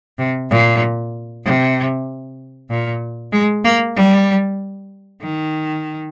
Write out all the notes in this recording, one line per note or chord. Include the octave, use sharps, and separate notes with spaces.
C3
A#2
C3
A#2
G#3
A#3
G3
D#3